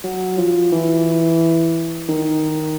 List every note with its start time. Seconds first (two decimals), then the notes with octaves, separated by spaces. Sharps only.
0.03 F#3
0.38 F3
0.72 E3
2.08 D#3